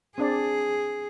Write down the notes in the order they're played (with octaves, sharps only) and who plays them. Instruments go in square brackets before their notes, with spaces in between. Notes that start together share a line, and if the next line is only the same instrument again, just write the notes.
[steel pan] C4 D4 D5 [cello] G#4